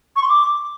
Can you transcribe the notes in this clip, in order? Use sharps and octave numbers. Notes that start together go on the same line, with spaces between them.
C#6
C6
D6